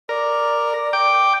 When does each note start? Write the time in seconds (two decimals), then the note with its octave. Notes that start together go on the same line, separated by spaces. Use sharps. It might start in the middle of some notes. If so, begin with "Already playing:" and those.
0.09 A#4 D5
0.93 G5 D6